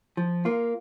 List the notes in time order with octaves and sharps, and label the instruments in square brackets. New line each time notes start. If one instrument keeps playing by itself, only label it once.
[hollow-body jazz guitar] F3
A#3 F4